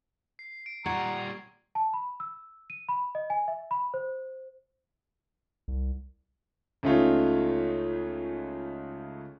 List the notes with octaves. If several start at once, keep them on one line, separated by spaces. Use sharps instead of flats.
C7
D7
A#2 G3 F#5 A#5 C#6 G#6 C7
A5
B5
E6
D#7
B5
D#5
G#5
E5
B5
C5
C2
C#2 C#3 A3 D#4 F4 C#5